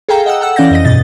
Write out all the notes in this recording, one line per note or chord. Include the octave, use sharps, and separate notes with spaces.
G#4 A4 F5 G5 A#5
D#5 F#5 G5 E6
A4 F#5 E6
E3 C#4 D5 F5 G6 A#6
F2 D#5 A#6
G2 B2 D#5 A6